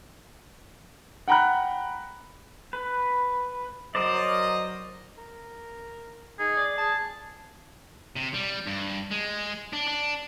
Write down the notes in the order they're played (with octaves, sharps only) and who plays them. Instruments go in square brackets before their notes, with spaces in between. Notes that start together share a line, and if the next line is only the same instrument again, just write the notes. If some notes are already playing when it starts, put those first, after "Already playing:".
[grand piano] F#5 G5 A#5 B5 F#6
[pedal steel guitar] B4
[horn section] F#3 F#4 D#5 [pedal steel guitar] A#4 C5 D5
[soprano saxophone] A#4
[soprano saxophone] D#4 [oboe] G#4
[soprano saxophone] D5
[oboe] G#4 [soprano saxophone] A5
[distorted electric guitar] C3
G3
G2
G#3
D4
D4